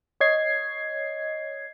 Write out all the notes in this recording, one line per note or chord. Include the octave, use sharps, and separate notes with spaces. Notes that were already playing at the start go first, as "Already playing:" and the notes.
C#5 D#5 G#6 C7